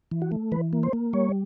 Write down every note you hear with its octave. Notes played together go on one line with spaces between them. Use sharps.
E3
F#4
A3
E3 B4
A#3
C5
A#3
G3 C#5